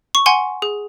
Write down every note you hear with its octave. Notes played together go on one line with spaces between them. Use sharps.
C#6
F#5 G#5 C6
G#4